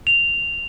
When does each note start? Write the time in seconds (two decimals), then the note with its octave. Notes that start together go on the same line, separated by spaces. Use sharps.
0.07 F7